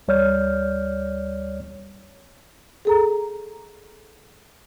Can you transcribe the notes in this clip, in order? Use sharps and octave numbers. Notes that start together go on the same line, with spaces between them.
D2 G3 C#5 D5 F6 G6
G#4 A4 A#5